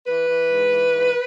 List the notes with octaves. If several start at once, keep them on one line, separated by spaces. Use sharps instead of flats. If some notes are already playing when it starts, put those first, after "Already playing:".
E3 B4
E3
G#2
E3
G#2